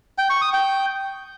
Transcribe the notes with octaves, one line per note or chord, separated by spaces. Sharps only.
G5
C#6
D#6
G5